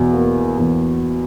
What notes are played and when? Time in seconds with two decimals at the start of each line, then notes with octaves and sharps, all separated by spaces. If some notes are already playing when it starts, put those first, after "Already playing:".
Already playing: E2 B2
0.13 A#3
0.58 E2